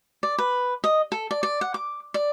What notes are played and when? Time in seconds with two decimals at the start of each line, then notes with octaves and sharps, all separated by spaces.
0.23 D5
0.38 B4
0.84 D#5
1.12 A4
1.31 D5
1.43 D5
1.61 F#5
1.74 D6
2.14 D5